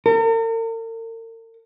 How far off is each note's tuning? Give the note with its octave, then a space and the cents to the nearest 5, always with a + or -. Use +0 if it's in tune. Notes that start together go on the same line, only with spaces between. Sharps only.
A#4 -45